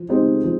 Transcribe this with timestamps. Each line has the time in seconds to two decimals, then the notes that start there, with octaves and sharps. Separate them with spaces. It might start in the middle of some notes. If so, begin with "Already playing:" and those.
Already playing: F3
0.09 G#3 C4 D#4 G4
0.44 F3